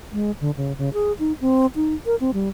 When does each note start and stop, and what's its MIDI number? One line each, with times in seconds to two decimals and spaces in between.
0.13 0.31 56
0.41 0.51 50
0.57 0.73 49
0.78 0.89 49
0.93 1.12 68
1.19 1.32 63
1.41 1.66 60
1.75 1.94 63
2.06 2.16 70
2.20 2.31 60
2.34 2.49 55